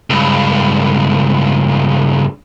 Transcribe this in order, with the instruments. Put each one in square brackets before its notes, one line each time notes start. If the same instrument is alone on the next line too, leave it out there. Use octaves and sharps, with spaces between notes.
[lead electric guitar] C#2 G2